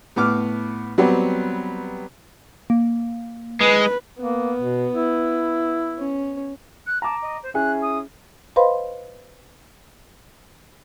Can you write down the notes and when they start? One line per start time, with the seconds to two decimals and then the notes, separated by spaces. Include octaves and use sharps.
0.16 A2 B3 D6 F6
0.98 F#3 G3 B3 C4 G4
2.70 A#3
3.61 G#3 B4
4.19 A#3 B3
4.58 B2
4.93 E4
5.99 C#4
6.86 F#6
7.02 A5 A#5 D6
7.22 D#5
7.43 C5
7.54 C#4 E4 G#4 F#6
7.82 D#6
8.56 B4 C5 D#5 F5 B5 C6